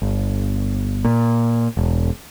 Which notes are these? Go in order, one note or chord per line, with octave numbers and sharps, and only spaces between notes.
G1
A#2
E1